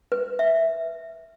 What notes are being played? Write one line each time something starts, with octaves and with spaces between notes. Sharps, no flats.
B4
E5